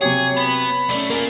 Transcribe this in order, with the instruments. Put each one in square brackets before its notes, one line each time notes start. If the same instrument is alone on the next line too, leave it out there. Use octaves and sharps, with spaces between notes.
[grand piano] C3 F#3 G4 [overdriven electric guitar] G#4 [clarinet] C#5
[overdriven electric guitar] B3 [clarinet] B5
[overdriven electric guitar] B1 A3 [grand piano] C#4 D5
[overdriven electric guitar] A#3 F4 [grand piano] A#4 D5 G#5